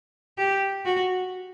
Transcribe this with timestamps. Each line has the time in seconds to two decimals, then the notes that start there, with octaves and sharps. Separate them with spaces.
0.38 G4
0.85 F#4